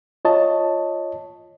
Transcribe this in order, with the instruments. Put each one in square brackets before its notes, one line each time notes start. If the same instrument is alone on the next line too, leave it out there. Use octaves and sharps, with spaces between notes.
[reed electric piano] F4 C#5 D#5 A5